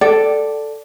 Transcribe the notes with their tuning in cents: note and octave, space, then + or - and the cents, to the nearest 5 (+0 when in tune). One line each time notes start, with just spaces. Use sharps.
A4 +0 D5 +0 G5 -35